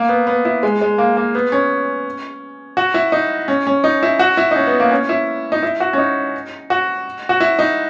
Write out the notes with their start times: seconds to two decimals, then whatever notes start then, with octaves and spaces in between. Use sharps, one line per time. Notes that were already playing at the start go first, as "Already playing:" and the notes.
Already playing: A#3
0.09 B3
0.27 B3
0.45 E4
0.63 G#3
0.81 G#3
0.98 A#3
1.17 A#3
1.35 B3
1.52 C#4
2.77 F#4
2.94 E4
3.12 D#4
3.48 C#4
3.67 C#4
3.84 D#4
4.03 E4
4.19 F#4
4.37 E4
4.51 D#4
4.56 C#4
4.67 B3
4.80 A#3
4.91 C#4
5.09 E4
5.52 D#4
5.63 E4
5.80 F#4
5.93 C#4
5.98 D#4
6.70 F#4
7.29 F#4
7.40 E4
7.59 D#4